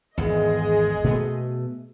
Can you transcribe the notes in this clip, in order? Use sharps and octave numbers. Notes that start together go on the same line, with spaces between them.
G#1 E2 G#3 G#4 D#5
B2 A3 B3